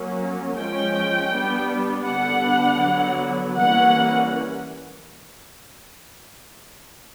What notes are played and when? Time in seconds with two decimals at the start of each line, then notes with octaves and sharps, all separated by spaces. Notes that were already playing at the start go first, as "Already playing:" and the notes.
Already playing: F#3 A#3 C#4
0.57 F3 G#3 C#4 G5
1.32 G3 B3 D4
2.07 D3 G3 B3 D4 F#5
2.82 D3 F#3 B3
3.57 E3 G3 A#3 C#4 F#5